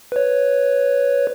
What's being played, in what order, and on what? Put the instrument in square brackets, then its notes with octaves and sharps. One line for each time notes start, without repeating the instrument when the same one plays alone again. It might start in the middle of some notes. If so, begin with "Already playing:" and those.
[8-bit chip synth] B4 C#5